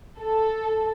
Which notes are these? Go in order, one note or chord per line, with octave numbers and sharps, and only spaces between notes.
A4